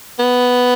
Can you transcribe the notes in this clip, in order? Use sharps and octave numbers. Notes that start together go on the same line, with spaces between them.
B3